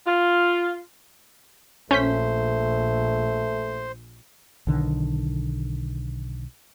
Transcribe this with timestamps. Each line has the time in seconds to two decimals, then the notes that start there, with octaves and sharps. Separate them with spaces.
0.07 F4
1.91 A#1 A3 C#4 C5 G6 B6
4.67 B1 D3 D#3